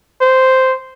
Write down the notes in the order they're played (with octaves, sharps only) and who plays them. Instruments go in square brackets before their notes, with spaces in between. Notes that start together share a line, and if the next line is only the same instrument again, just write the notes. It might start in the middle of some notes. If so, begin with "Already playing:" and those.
[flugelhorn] C5